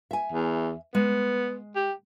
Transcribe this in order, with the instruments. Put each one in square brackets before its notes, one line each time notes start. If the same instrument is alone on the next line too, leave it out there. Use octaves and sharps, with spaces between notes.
[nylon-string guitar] E5 G#5
[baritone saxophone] E2
[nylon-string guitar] G#3 [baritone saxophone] B3
[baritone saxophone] G4